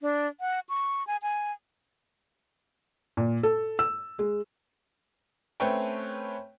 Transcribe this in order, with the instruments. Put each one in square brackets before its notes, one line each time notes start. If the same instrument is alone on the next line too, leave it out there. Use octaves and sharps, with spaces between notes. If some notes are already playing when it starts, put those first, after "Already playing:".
[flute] D4
F#5
C#6
G#5
G#5
[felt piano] A#2
A4
E6
G#3
[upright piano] A3 C4 C#4 B4 C#5 G5